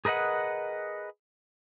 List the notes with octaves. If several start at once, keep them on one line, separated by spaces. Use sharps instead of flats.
G#4 A#4 B4 D#5 F#5